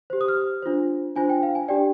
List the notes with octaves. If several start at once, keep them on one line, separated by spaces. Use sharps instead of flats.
G4 C5
D#6
F6
D4 F4 C5
D4 F4 C5 G#5
G5
F5
G#5
D4 G4 D5 G5